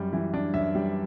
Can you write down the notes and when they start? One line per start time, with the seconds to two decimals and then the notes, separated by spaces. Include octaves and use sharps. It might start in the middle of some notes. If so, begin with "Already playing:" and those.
Already playing: F#2 G3
0.13 E3
0.34 D4
0.54 F#2 E5
0.75 G3